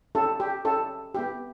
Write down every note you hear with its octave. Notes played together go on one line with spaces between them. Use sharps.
C#4 E4 G4 A4
G4
C#4 E4 G4 A4
B3 E4 G4